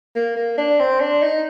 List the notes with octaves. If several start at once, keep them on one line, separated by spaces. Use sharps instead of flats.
A#3
A#3
D4
C4
D4
D#4